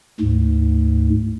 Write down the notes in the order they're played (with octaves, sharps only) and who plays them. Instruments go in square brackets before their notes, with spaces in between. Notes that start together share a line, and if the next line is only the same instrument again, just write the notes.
[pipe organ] D2 G#2